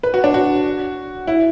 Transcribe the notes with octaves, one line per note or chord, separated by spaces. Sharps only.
B4
F#4
D4
F#4
E4